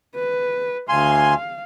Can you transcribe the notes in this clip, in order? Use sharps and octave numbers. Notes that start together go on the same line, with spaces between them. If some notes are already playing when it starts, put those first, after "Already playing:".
B4
D2 F5 G#5 C6